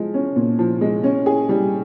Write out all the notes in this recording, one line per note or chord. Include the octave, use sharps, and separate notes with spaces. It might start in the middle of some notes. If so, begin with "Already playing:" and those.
Already playing: F3 G#3
C#4
A#2
F3
G#3
C#4
G#4
G3